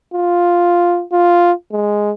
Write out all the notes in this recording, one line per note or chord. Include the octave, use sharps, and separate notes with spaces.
F4
F4
G#3